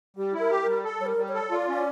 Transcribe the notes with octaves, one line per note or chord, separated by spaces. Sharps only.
G3 G4
E4
A#4
G4
G3 A#4
A4
G3 C#5
A#4
G3
C#5
A4
F4 D5
C#4
D5